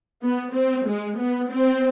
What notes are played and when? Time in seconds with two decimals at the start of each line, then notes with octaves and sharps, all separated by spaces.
0.22 B3
0.54 C4
0.85 G#3
1.18 B3
1.49 C4